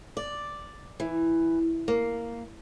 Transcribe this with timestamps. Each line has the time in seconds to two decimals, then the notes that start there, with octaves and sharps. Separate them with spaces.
0.17 D5
1.00 E3
1.88 A#3